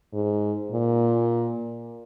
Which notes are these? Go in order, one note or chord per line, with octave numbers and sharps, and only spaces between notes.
G#2
A#2